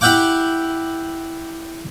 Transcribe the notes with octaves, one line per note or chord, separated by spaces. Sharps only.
E4 G4 E5 F#5 G5 D6